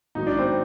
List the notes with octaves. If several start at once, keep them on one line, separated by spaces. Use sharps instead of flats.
G#2 D#3 F#3 D#4
D4
C4